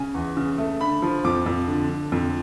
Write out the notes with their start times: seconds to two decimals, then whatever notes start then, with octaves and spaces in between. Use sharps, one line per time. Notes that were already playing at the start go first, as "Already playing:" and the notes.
Already playing: C#3 G#5
0.14 E2
0.37 C#3
0.58 A3
0.81 D3 B5
1.02 F3
1.24 F2 D6
1.46 F2
1.67 D3
1.89 D3
2.12 F2